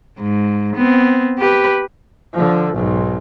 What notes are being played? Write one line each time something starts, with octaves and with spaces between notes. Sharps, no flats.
G#2
B3 C4
G4 B4
D3 F3
B1 G#2